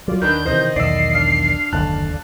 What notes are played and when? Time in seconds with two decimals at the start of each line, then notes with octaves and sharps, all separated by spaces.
0.08 F#3 F4 D5
0.22 D#2 D#3 D4 A#4 B4 G6
0.45 C3 D#3 E3 C5 D#5
0.76 B1 E2 D#3 D5 E6 C7
1.14 D4 F5 F6
1.73 F#1 D#2 D3 A5 F#6